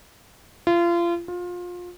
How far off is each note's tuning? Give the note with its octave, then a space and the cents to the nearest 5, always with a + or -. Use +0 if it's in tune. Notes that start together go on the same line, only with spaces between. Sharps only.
F4 -30
F4 +25